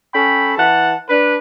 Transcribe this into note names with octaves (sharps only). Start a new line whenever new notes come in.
C#4 A4 G5 B5
E3 F#5 A5
D4 B4